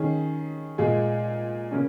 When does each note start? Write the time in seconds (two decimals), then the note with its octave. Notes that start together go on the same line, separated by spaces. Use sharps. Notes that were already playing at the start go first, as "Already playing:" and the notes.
Already playing: D#3 C#4 G#4
0.78 A#2 G#3 F4 G#4
1.71 C#3 A#3 C#4